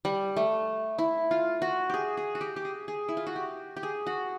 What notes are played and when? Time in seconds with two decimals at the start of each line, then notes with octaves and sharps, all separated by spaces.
0.05 G3
0.37 A3
0.98 E4
1.31 F4
1.62 F#4
1.90 G4 G#4
2.17 G#4
2.35 F#4
2.41 G4
2.56 G4
2.65 G#4
2.88 G#4
3.09 E4
3.17 F4
3.27 F#4
3.36 G4
3.77 G4
3.83 G#4
4.07 F#4